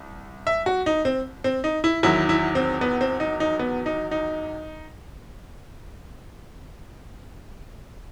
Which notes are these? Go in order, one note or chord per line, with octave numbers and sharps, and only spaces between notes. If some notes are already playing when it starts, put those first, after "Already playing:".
Already playing: C2
E5
F#4
D#4
C4
C4
D#4
E4
E2 D#3 F#3 E4
E4
C4
B3
C4
D#4
D#4
B3
D#4
D#4